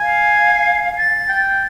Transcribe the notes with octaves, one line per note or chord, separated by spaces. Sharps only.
F5 G#5
A6
G5